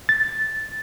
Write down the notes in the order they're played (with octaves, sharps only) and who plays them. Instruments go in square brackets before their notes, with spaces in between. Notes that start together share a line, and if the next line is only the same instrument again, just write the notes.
[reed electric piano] A6